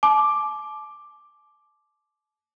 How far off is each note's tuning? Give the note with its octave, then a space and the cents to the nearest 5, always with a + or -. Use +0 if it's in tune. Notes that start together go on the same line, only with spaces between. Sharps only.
A5 -40 D6 +5